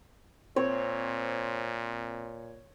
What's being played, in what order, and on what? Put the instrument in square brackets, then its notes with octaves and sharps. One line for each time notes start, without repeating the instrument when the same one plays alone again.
[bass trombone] A#2 [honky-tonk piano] C4 [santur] C#5